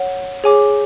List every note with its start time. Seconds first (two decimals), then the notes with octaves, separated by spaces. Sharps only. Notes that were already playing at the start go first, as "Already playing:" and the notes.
Already playing: C#5 F#5
0.44 G#4 C#5 G#5 D6